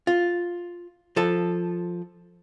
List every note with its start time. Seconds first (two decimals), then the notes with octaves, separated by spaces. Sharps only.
0.07 F4
1.16 F3 A4